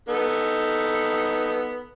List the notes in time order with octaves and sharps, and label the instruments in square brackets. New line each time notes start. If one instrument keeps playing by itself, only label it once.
[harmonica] B3 D#4 A4